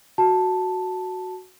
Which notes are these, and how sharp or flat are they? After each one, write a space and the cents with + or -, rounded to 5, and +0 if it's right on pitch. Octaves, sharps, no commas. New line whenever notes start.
F#4 +0 A5 +0